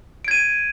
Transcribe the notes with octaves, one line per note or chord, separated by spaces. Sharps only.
G#6 D7 D#7